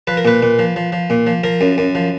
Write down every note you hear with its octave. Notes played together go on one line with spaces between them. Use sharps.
F3 B4
A#4
A#2 B4
A#2
F3
F3
F3
A#2
F3
F3 A#4
F#2
F#2
F3